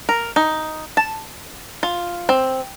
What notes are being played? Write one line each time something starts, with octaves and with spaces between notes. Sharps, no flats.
A#4
D#4
A5
F4
C4